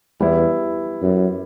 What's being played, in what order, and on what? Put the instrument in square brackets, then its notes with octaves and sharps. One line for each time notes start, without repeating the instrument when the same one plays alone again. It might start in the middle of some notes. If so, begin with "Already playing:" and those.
[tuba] E2 [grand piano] G3 B3 E4
[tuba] F#2